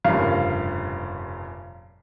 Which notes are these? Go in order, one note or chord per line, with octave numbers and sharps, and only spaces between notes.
F1 G2 A#2 C#3 F5